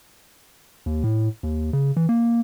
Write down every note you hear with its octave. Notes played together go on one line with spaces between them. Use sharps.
D#2
A2
D#2
C#3
E3
A#3